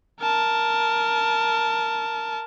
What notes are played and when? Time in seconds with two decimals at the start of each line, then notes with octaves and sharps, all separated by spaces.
0.20 A#4 A5